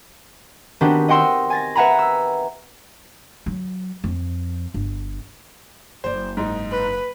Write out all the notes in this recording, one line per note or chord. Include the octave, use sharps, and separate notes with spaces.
D#3 B3 C4 D4 F#4 G4
D#5 F#5 G5 C6 E6
G#5 A6 A#6
B4 E5 F#5 G#5 A#5 B5
E6
F#3
F2
G1
F#1 C#3 C5 D5
G#2 D#4
B4